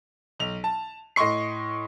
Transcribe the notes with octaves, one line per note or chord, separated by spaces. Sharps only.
B1 F7
A5
A2 D#5 C6 C#6 C7